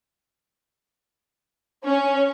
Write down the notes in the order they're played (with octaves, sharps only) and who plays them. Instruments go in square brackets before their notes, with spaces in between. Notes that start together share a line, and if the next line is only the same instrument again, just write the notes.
[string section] C#4